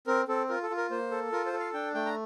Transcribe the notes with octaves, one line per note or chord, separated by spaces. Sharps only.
C4 A#4
C4 A4
F4 A#4
A4
F4
A#4
A#3 C5
A4
F4 A#4
C5
A4
F5
D4 G5
A3 G5
A#5